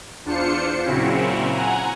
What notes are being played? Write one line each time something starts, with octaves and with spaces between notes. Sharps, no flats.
E2 D4 F4 C5 C#7
A#2 C#3 F#3 C4 C#4 E4
F#5 G#5 A#5